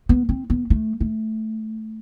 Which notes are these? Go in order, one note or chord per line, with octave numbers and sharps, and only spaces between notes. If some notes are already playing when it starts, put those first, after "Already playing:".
B3
C4
B3
A3
A3